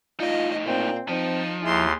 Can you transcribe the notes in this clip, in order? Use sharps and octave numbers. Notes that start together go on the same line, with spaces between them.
A2 D#4 F4 D#5
A#2 C4
F3 C4 D#4
D#2 G#3 E4 C6